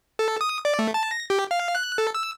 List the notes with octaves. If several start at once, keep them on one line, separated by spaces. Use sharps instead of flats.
A4
D#6
D5
A3
A5
A#6
G4
F5
F#6
A4
E6